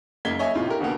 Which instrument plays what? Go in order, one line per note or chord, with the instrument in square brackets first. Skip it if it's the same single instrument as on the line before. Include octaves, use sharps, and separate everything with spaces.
[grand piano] F#1 A#3 D#5 G#6 B6 G7
C#5 D#5 E5 G#5
A2 C3 F4
G4 A#4
D2 B2 A#3 B3